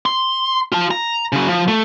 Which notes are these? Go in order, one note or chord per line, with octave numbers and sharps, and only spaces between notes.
C6
F4 A5
A#5
C#3 F#3
F3
A3